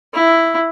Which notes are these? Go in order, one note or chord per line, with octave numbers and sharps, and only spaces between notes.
E4